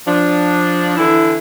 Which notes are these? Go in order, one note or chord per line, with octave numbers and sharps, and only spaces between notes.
F3 D4
D3 E3 E4